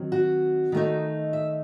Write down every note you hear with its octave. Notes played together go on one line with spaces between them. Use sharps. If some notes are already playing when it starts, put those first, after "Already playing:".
Already playing: D#3 F#3 C4
F#4
D#3 A3 D#4
E5